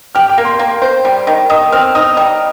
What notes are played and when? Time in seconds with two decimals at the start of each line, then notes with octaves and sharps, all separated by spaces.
0.15 G4 F6
0.29 G5
0.38 A#3
0.45 C6
0.59 A#3
0.82 C5
1.05 G3
1.27 D#3
1.50 D#3 D#6
1.72 C4 F6
1.95 D#4 D#6
2.17 G3